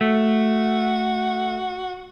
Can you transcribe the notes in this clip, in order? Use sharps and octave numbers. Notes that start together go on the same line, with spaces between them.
A3 F#4